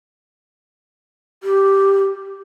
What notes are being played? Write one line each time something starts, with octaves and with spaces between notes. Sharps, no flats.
G4